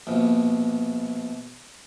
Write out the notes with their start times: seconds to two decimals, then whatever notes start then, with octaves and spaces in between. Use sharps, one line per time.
0.07 A#1 B2